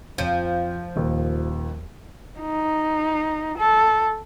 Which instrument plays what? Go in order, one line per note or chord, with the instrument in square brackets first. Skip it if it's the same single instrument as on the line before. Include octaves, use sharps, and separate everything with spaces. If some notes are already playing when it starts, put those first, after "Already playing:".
[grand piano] F2 [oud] F3
[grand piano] D#1 D#2
[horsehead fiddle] D#4
A4